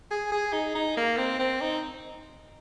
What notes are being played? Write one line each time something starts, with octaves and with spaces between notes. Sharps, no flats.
G#4
G#4
D#4
D#4
A#3
C4
C4
D#4